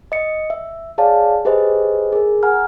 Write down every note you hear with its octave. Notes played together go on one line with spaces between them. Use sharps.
D#5 C#7
E5
G#4 C#5 D5 F5 A5
G4 G#4 B4 C5 D#5
G#4 A#4
F#5 G#5 A#5 F6